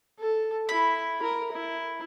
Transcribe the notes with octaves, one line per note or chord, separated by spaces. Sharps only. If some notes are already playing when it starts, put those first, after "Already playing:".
A4
E4 B5
A#4
E4